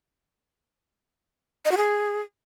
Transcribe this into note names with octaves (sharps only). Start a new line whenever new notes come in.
D#5
F#4
G#4